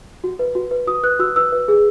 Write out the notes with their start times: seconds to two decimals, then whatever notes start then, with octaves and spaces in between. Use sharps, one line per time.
0.24 F#4
0.39 B4
0.55 F#4
0.71 B4
0.87 F#4 D#6
1.03 B4 F#6
1.19 F#4 E6
1.36 B4 E6
1.52 B4
1.68 G#4